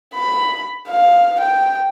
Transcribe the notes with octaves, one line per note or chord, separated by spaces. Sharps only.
B5
F5
G5